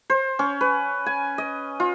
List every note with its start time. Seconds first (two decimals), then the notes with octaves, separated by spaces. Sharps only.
0.10 C5
0.39 C#4
0.61 B4
1.06 G#5
1.38 D#5
1.80 F4